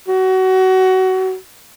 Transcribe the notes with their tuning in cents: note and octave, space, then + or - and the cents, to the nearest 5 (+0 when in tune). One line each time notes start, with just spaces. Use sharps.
F#4 +25